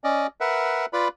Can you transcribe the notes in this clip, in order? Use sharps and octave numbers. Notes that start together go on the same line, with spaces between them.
C#4 D5 D#5
A#4 B4 E5 F#5
F4 B4 D5 B5